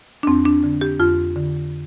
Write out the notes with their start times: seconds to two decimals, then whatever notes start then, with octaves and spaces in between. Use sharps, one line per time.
0.23 D4
0.27 F2 C4
0.45 D4
0.64 D3
0.81 G4
1.00 F2 F4
1.36 D3